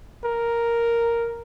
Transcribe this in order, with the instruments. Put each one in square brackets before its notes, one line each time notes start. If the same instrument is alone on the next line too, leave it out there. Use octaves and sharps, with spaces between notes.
[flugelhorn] A#4